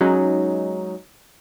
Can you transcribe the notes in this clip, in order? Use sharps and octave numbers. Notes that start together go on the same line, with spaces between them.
F#3 G#3 C#4 D#4